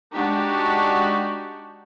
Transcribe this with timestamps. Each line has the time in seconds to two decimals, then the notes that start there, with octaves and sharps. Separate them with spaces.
0.15 G#3 D4 D#4 F#4 G4